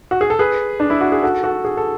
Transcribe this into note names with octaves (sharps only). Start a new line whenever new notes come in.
F#4
G#4
A4
G#4 B4
D4
E4
F#4
G#4
F#4 A4
F#4 A4
G#4
A4